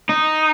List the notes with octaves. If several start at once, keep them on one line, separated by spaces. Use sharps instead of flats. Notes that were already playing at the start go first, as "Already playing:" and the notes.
D#4